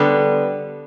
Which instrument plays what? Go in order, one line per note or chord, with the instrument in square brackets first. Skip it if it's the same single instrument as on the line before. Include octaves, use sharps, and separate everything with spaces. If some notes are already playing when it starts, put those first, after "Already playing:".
Already playing: [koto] D3 G3 B3 D5